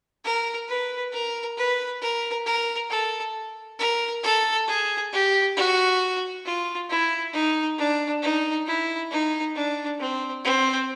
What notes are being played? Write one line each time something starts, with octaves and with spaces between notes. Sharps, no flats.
A#4
B4
A#4
B4
A#4
A#4
A4
A#4
A4
G#4
G4
F#4
F4
E4
D#4
D4
D#4
E4
D#4
D4
C4
C4